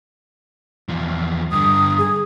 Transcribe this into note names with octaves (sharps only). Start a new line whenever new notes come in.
E2 F3
G2 D3 D#6
G#4